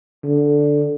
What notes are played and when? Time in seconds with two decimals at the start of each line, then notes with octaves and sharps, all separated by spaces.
0.24 D3